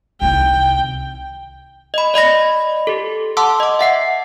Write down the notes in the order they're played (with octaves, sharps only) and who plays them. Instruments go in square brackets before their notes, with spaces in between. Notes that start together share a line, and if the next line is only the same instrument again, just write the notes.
[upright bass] C2 D#3 [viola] G5
[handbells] D#5 B5
D5 D#5 B5 A#6
G4 A4
F#5 A5 C6 D6 E6
D#5 D6
E5 F#5 C7